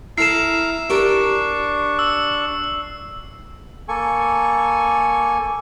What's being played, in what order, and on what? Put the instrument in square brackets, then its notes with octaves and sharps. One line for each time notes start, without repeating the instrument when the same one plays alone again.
[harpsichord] E4 A4 [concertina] A#5 E6 F6 [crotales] C7 E7
[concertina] D4 C#6 [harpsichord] G4 A#4
[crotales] E6
[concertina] A#3 A4 G#5 C#6